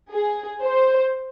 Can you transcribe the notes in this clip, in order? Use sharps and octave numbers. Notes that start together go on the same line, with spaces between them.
G#4
C5